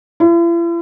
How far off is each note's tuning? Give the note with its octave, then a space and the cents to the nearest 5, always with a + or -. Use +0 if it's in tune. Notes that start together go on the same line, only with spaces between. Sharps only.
E4 +45